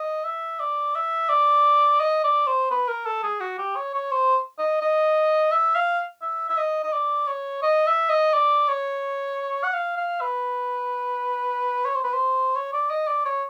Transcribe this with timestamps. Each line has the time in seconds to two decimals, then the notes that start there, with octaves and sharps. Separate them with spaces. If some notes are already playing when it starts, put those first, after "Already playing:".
Already playing: D#5
0.24 E5
0.60 D5
0.95 E5
1.29 D5
2.00 D#5
2.24 D5
2.47 C5
2.71 B4
2.88 A#4
3.06 A4
3.23 G#4
3.40 F#4
3.58 G4
3.76 C#5
3.94 C#5
4.12 C5
4.59 D#5
4.82 D#5
5.51 E5
5.75 F5
6.22 E5
6.50 E5
6.57 D#5
6.83 D#5
6.93 D5
7.27 C#5
7.63 D#5
7.87 E5
8.09 D#5
8.34 D5
8.68 C#5
9.64 F#5
9.74 F5
9.97 F5
10.21 B4
11.85 C#5
11.95 C5
12.04 B4
12.13 C5
12.56 C#5
12.73 D5
12.90 D#5
13.07 D5
13.25 C#5